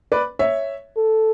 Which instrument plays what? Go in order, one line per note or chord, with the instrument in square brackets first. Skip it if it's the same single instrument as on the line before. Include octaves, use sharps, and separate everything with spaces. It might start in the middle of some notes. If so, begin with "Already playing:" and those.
[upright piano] B4 D5
C#5 E5
[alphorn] A4